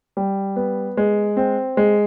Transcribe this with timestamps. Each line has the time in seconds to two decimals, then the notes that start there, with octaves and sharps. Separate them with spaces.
0.17 G3
0.56 B3
0.97 G#3
1.37 C4
1.77 G#3